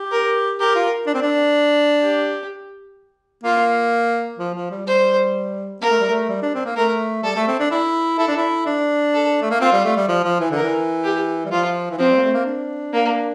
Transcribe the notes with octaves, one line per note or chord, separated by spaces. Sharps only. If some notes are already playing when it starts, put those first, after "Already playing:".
Already playing: G4
A#4
G4 A#4
F4
D4
C4
D4
G4
A#3 F4
F3
F3
G3
G3 C5
A#3 A#4
A3
G3
A3
G3
D4
C4
A#3
A3 A#4
G3 A4
A3
C4
D4
E4
E4 A4
D4
E4
D4
A4
A3
A#3
C4 F4
G3
A3
G3
F3
F3
E3
D3 A#4
E3
G4
G3
F3 F4
E3
F3 C4
G3
A#3
A3
A#3
D4
A#3